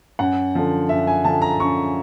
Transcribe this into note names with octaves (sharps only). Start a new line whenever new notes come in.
F#2 F#5
D3 F3
F#2 E5
G#5
D3 F3 A5
A#5
F#2 C#6